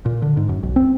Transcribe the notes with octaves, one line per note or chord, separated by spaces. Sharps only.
A#2
D3
G#2
F#2
B1
C4